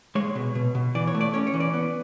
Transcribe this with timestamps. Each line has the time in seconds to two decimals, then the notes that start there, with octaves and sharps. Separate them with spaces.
0.15 G#3 C#5
0.35 B2
0.55 B2
0.75 B2
0.95 E3 D5
1.08 C#5
1.15 A3
1.21 D5
1.34 C#4 C#5
1.47 C#5
1.54 E3
1.60 D5
1.73 B3